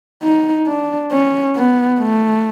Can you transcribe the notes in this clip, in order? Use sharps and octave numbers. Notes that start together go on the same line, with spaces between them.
D#4
D4
C#4
B3
A3